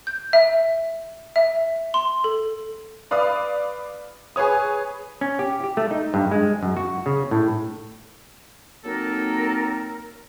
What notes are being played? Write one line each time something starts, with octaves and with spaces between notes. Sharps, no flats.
G6
E5
E5
C6
A4
B4 D5 F5 B5 D#6
G#4 B4 C#5 D#6
C#4
G4
G4
A3
D#4
G2
G#3
F#2
F#4
C#3
A2
F#3 A#3 C4 D#4 A4 A#4